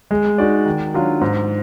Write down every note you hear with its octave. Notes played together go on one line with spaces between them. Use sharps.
G#3
D#4 F#4 D5
D#3
F#3 D4 F4
G#2